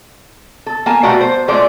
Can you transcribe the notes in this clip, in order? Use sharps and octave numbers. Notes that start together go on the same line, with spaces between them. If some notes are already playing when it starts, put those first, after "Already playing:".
A4
A#3 G#5 A5
B2 G3 A3 A#3 F#4 D5
C5
F3 G#3 A3 D5